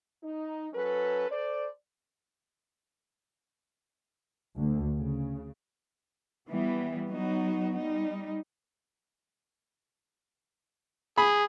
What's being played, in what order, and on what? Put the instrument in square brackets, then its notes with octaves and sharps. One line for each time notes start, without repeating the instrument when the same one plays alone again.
[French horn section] D#4
F#3 C#4 A4 B4
A4 C5 D5
[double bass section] D2
C#3
[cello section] E3 G3 B3
F#3 B3 D#4 F#4
G3 D#4
[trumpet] G#4 [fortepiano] B5